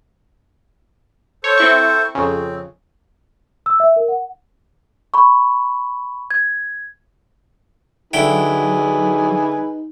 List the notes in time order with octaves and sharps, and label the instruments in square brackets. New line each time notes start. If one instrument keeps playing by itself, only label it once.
[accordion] A4 C5 [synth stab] C#5
[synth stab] C4 E4 C#6
[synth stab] F2 C#3 [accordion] C4
[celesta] E6
E5
A#4
F#5
B5 C#6
G#6
[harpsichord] D3 E4 G5 [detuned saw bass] F#3 [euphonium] D#4 [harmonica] G#4 B4